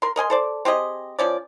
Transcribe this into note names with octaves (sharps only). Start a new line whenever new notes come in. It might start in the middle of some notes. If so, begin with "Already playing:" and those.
A#4 C6
A#4 D#5 G#5 C6
A4 C5 D5
C4 G4 G#4 D#5
F3 C#4 D5